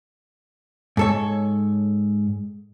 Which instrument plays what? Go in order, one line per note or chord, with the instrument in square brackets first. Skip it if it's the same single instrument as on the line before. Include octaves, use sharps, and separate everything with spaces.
[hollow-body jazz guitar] G#2 A4 C#5